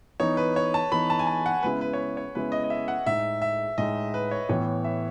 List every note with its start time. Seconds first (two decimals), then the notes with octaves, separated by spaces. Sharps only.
0.20 E3 B3 D#4 C#5
0.37 B4
0.56 C#5
0.74 A5
0.92 E3 B3 D#4 B5
1.10 A5
1.19 G#5
1.27 A5
1.46 F#5
1.63 C#3 G#3 B3 E4 B4
1.81 B4
1.93 C#5
1.98 B4
2.17 C#5
2.35 C#3 G#3 B3 E4 B4
2.52 D#5
2.64 D#5
2.70 E5
2.88 F#5
3.06 A2 G#3 D#4 E5
3.42 E5
3.78 A2 G#3 D#4 D#5
4.14 B4
4.31 C#5
4.49 A2 E3 B3 C#5
4.84 E5